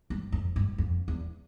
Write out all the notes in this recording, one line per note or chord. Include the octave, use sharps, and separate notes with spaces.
G2
F2
G2
F2
E2